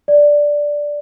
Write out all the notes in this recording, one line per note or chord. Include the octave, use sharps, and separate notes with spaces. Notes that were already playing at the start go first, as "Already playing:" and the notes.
D5